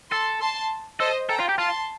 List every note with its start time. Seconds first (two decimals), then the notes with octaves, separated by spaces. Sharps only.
0.11 A4 A5 C6
0.41 A5 C6
1.00 A4 C5 D#5
1.29 A4 G5 A#5
1.40 F4
1.49 G4
1.58 F4 A5 C6